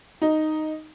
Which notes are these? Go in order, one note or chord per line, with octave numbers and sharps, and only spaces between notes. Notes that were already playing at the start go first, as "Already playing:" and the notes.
D#4